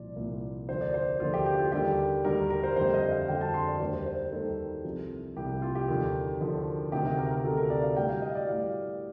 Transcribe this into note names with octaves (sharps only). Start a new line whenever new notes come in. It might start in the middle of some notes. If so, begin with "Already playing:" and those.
Already playing: C2 A#2 F3 D5
C2 A#2 F3
D#2 D3 F3 C5
D5
C5
D#2 D3 F3 F4
G4
G4
F4
D#2 D3 G3 G4
D#2 D3 G3 A#4
A#4
C5
F2 D3 G3 C5
D#5
F5
F2 D3 G3 G5
A5
C6
D5
D#2 D#3 G3 C5
C5
C5
A#4
D#2 D#3 G3 A4
C2 C3 F3
C2 C3 F3 G4
F4
G4
D#2 D3 F3
D#2 D3 F3
D2 C3 D#3 G4
A#4
A#4
A#4
D2 C3 D#3 A4
A#4
D5
F5
A2 G3 G5
F5
D#5
D5
A2 G3 F5